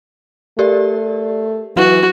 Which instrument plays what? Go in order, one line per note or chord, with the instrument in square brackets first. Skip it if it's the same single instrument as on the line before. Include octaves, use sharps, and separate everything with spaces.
[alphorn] A3 [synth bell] G4 A#4 D5
[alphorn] E3 [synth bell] F#3 [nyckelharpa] F#4